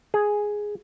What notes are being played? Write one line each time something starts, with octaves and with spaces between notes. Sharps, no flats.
G#4